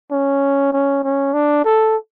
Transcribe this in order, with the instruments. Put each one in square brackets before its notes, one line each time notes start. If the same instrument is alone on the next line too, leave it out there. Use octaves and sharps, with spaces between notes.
[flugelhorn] C#4
C#4
C#4
D4
A4